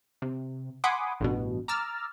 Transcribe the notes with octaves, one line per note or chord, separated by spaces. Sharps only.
C3
F#5 G#5 B5 C6 D6 D#6
A1 G2 B2
A#5 D6 E6 F6 A6